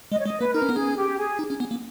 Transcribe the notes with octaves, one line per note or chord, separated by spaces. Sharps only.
G#3 D#5
C#5
G#3 D#5
A#3 B4
D#4 A#4
C#4
B3
C#4 G#4
G4
G#4
D#4
C#4
B3
A#3